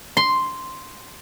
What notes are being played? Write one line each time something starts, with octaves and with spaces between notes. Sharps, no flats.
C6